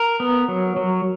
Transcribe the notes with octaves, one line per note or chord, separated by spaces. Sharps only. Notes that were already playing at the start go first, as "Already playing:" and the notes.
Already playing: A#4
B3
F#3
F#3